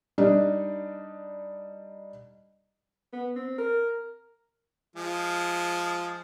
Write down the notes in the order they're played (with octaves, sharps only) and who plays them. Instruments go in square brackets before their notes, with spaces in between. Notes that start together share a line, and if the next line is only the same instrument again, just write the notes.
[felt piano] G3 D4 D#4
[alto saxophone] B3
C4
A#4
[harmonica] F3 G#3